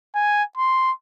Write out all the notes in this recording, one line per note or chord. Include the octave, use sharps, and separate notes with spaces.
G#5
C6